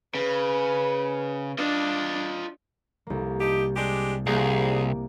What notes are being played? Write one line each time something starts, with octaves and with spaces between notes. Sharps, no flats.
C#3 B4
D4 F4 D#5
C2 A#3
F3 D#4 G4
G#3 D4 G4
C2 F3 A#3 G4 G#4